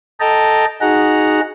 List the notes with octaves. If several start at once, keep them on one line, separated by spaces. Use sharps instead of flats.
A4 D#5 G5 A5 A#5
D#4 F#4 G#4 F#5 A#5